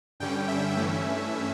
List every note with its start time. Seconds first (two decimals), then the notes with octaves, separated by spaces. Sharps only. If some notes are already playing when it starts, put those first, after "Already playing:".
0.20 G2 D3 G3 C#4 G5
0.48 E5
0.77 G2 E3 A3 C#4